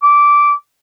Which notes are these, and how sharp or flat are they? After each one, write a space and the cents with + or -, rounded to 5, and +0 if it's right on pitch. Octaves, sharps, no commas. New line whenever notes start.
D6 -10